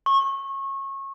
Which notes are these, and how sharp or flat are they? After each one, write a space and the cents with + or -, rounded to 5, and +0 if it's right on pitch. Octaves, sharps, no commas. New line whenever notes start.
C#6 -25